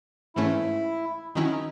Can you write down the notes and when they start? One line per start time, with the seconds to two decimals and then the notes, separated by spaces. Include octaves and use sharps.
0.35 G#2 E3 A3 C#4 E4
1.35 D#3 F#3 C#4 D#4 E4